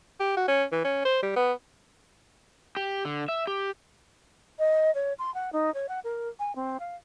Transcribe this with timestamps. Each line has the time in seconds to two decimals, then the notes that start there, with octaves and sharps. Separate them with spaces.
0.20 G4
0.37 F#4
0.48 C#4
0.72 E3
0.84 C#4
1.05 C5
1.22 G3
1.36 B3
2.77 G4
3.05 D3
3.29 E5
3.47 G4
4.59 D#5
4.95 C#5
5.19 C6
5.34 F#5
5.53 D#4
5.74 C#5
5.89 F#5
6.04 A#4
6.39 G#5
6.56 C4
6.80 F5